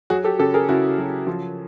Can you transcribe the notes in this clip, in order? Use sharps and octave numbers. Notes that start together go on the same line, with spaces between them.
F#3 F#4 G#4
G4 A4
C#3 G4 A4
G#4 A#4
C#3 E4 F#4
F#3
F3